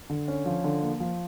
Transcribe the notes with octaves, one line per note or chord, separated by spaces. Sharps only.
D3
C#4
F3
D3
A#3
F3